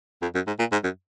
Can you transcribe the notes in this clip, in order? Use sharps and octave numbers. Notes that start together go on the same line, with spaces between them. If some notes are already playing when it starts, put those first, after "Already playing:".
F2
F#2
G#2
A#2
G#2
F#2